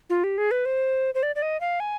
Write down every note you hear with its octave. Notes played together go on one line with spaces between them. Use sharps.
F4
G4
G#4
B4
C5
C5
D5
D5
D#5
F5
G#5